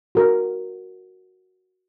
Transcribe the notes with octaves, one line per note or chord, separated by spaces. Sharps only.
F#4 A#4